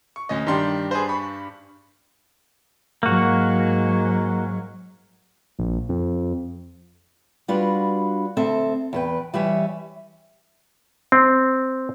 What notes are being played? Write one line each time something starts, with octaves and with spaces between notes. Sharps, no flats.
C#6
D2 C#4 D#5
G2 D#3 D4 G4 C6
G#4 B4 C5
B5 C#6
G#2 F#3 A#3 F#4
A#1
F2
G3 D4 F4 F#4 B4
D2 C4 A4 E5
E2 B4 G5
E3 G3 C#5 E5 G#5
C4